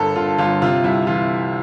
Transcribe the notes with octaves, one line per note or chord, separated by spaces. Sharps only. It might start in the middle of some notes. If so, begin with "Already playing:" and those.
Already playing: G1 G2 A4 A#4
D3 F4
G1 F4
C3 F4
C2 E4
E3 F4